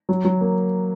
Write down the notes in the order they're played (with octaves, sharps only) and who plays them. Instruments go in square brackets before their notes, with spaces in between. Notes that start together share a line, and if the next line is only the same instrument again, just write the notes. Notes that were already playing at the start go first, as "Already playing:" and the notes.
[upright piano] F#3
F#3
A#3